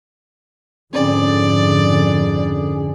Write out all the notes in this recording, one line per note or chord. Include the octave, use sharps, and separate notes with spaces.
F2 G#2 D3 C4 C#4 G#4 D5